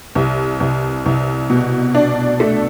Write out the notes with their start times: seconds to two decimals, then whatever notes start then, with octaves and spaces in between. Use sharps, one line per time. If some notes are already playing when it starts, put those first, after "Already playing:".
0.15 C2
0.60 C2
1.06 C2
1.50 B2
1.95 D4
2.40 A3